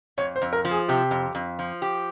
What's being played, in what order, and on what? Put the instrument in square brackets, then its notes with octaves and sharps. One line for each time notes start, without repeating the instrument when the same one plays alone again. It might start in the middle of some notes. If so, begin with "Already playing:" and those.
[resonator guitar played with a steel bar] F2 [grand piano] C#5
[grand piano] C5
[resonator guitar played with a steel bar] F2
[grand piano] A#4
[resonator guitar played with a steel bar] F3
[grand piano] G#4
[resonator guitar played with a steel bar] C3 [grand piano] G4
[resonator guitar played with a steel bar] F2
F2
F3
G4